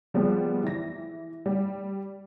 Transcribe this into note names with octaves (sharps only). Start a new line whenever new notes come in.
F3 G3 G#3 B3
E3 A#6
G3